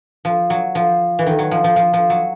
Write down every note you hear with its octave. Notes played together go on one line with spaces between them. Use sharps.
F3
F#3
F3
E3
D#3
F#3
F3
F3
F3
F3
F#3